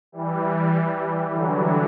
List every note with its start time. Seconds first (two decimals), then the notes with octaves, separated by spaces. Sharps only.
0.12 E3 G3
1.32 D3 F#3